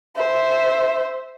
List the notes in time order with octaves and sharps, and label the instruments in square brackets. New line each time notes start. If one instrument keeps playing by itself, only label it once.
[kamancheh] C5 E5